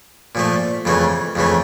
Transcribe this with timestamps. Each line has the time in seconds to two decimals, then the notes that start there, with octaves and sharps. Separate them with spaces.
0.35 A#2 F3 A3
0.85 F2 C#3 E3 A3
1.35 F2 C#3 E3 A3